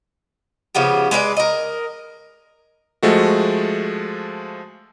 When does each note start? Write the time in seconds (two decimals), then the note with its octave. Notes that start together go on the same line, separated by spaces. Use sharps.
0.75 C#3 F3 B3 G4
1.11 G#3 B4 C#5 D5
1.37 A#4 D#5
3.03 F3 G#3 A3 F#4